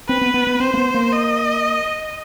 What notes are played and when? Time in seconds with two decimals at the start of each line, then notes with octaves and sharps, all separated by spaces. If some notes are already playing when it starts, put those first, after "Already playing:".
0.08 C4 B4
0.21 B3
0.34 B3
0.47 B3
0.60 C4 C5
0.74 A#3
0.77 B3
0.94 A#3
1.12 D#5